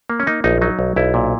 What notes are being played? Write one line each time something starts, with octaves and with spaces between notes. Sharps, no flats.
A#3
C#4
A#3 D#4
A#1 D#4
F#3 D#4
B1
B1 E4
A#2